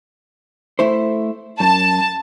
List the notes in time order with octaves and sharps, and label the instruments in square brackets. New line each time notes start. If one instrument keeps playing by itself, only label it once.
[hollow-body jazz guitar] A3 E4 C5
[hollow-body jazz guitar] F#2 [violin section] A5